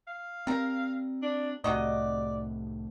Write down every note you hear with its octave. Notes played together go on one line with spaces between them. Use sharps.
F5
G3 C4 A#4
D4
C2 A2 C3 F#4 D5 D#5